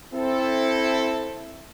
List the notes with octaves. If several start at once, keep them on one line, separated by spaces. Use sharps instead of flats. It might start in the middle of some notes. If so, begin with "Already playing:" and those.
C4 E4 A4